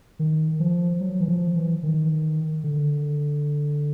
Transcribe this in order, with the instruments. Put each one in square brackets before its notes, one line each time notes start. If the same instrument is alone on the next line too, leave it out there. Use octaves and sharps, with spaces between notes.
[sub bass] D#3
F3
F#3
E3
F3
E3
D#3
D3